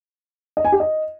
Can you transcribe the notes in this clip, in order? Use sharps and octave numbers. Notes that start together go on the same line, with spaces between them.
D#5
G#5
G4
D#5